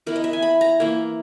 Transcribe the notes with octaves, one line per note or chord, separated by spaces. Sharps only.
E3 B3 E4 A#4
D#5
E5
G#5
B5
A#5
E3 A#3 E4